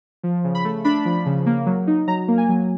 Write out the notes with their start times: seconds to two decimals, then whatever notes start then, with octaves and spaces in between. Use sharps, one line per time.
0.23 F3
0.44 C#3
0.55 B5
0.65 A3
0.85 D4 B5
1.05 F3
1.26 C#3
1.46 A#3
1.66 F#3
1.87 D#4
2.07 F#3 A#5
2.28 A#3
2.38 G#5
2.49 F#3